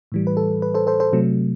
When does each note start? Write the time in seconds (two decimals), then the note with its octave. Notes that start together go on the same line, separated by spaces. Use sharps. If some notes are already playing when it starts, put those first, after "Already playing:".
0.12 A2 E3 G3
0.27 B4
0.37 A4
0.62 B4
0.74 A4 C5
0.87 A4 C5
1.00 A4 C5
1.13 C3 F#3 A3